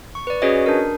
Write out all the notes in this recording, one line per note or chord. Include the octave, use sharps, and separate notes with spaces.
C#6
B4 D5
C#4 F#4 G#4 B4 C#5 D#5
D4 A#4